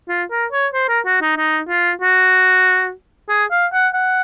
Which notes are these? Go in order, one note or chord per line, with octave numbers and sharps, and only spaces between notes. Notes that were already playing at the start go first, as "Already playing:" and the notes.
F4
A#4
C#5
C5
A#4
F#4
D#4
D#4
F4
F#4
G#4
F5
F#5
F#5